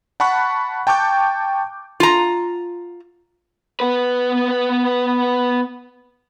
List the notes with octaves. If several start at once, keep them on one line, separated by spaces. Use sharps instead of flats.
F#5 A5 B5 C#6 F#6
G5 A5 C#6 D6 G6
F4 A#5
B3 B4